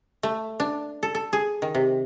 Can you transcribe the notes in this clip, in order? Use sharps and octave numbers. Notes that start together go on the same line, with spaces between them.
A3
D4
A4
A4
G#4
D#3
C3